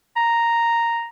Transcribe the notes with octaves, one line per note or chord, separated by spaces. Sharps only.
A#5